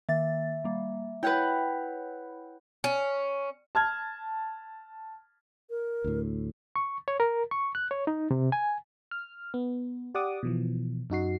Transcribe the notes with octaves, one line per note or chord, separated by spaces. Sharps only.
D#3 A#3 E5 A6
G3 A#3
E4 B4 C#5 F#5 G5
C#4
A5 F6 G#6
A#4
D2 A2
C#6
C#5
A#4
C#6
F#6
C#5
D#4
C3
G#5
F6
B3
G4 D5 F#5 D6 D#6
B2 E3 F3
F#2 D#4 F#4 C7